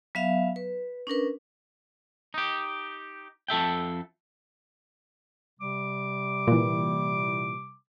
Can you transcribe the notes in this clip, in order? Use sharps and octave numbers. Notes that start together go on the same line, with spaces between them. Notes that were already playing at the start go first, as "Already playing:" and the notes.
F#3 B3 E5 F5
B4
C#4 D4 A#4 B4
D#4 G4
F2 A4 E5 G5
C3 G3 D6
A#2 E3